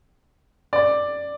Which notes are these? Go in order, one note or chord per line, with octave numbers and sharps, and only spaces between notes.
D5